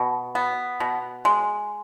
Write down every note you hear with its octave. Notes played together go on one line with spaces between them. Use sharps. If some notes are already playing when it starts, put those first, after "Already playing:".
Already playing: B2
B3
B2
G#3